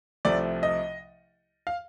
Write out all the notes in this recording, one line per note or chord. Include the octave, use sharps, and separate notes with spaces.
C2 C3 F3 A3 D5
D#5
F5